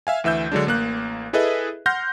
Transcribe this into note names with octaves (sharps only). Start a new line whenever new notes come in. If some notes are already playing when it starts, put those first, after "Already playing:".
E5 F5 G#5
D2 E3 E5 E6 G6
D3 F#3 G#3 D4
A1 A#3 F#6
E4 G#4 A4 B4 D#5 E5
F#5 C6 F6 G6 A#6